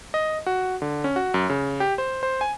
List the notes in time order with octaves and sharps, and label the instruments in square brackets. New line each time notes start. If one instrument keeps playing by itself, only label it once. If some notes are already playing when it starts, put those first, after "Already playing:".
[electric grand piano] D#5
F#4
D3
C#4
F#4
F#2
C#3
G4
C5
C5
G#5